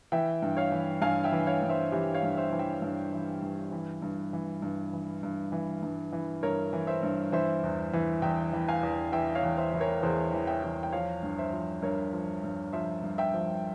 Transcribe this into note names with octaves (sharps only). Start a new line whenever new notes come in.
E3 E5 G5
G2
C#5 F5
E3
G2 F5 G#5
E5 G5
E3
C#5 F5
G2
C5 E5
E3 G4
C#5 F5
G2
C5 E5
E3
E5 G5
G2
E3
G2
E3
G2
E3
G2
E3
G2
E3
G2
E3
G2 A#4 C#5
E3
C5 E5
G2
E3 C5 E5
E2
E3
E2 E5 G5
E3
F5 G#5
E2
E3 E5 G5
C#5 F5
E2
C5 E5
E3
A#4 C#5
E2 G#4 C5
E3
E5 G5
E2
G5
F3 C#5 F5
G2
C5 E5
F3
G2 A#4 C#5
F3
G2
F3 C5 E5
G2
E5 G5
F3